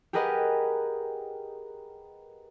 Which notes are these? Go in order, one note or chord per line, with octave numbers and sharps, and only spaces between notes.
G4 G#4 A#4 B4 D#5 F#5